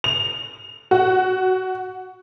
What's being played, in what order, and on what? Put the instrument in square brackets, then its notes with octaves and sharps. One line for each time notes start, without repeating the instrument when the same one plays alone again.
[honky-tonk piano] F7
F#4